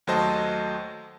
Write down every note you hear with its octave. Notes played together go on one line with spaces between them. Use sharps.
D#2 F#3 A3 C5 D#5 A5